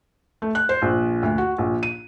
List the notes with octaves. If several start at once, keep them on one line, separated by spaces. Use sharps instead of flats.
A3
F#6
C5
A#1
D2
F#4
A#1
D#7